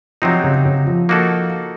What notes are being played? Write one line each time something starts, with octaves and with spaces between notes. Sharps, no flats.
C3 F3 F#3 C4 D#4
C#3
C#3
F3
A#3 D#4 F#4 A4